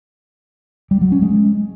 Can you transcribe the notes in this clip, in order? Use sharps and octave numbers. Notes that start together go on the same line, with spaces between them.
G3
F#3
C#4
G#3